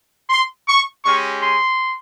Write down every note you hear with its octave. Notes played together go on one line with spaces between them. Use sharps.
C6
C#6
G#3 C#4 G4 C#6
C6